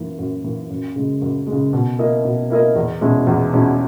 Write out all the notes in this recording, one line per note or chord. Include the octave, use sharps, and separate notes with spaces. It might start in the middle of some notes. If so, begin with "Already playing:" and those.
Already playing: F#2 E3 A#3
F#2
E3 A#3
F#2
C#3 G#3
F#2
G#3
C#3
B2
A#3 E4 A#4 D#5
B2
A#3 E4 A#4 D#5
E2
B2 G#3 C#4 E4
E2
B2 G#3 C#4 E4